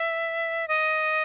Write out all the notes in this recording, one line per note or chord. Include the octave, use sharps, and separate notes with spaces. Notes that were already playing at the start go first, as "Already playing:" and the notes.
Already playing: E5
D#5